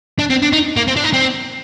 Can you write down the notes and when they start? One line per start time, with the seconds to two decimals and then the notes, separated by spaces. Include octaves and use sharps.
0.19 D4
0.30 C4
0.42 D4
0.53 D#4
0.76 A#3
0.88 C4
0.96 D4
1.04 D#4
1.13 C4